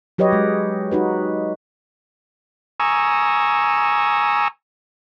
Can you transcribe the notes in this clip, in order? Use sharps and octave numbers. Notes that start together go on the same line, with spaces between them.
F#3 G4 B4 C#5 D#5
G#3
D#4 F#4 B4
G#5 A#5 C#6 D#6 E6